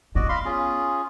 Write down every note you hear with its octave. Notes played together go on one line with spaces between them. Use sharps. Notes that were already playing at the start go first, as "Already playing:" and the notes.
B3 F#4 D5 D#5
F5 B5 C6
C#4 F4 G#4